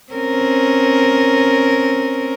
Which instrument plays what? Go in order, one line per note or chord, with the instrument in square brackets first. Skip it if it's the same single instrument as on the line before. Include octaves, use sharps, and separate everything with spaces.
[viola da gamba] C4 C#4 A#4